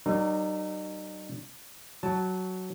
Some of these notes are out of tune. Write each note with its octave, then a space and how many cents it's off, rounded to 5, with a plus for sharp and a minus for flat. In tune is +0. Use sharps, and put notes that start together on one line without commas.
G3 -45 D#4 -30 A#4 +0
F#3 +5 A5 +0